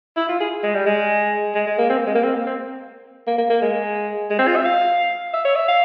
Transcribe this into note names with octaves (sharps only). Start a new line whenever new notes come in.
E4
F4
G#4
G#3
G3
G#3
G#3
G#3
A#3
C4
A#3
G#3
A#3
C4
A#3
C4
A#3
A#3
A#3
G#3
G#3
C4
F4
E5
F5
E5
C#5
E5
F5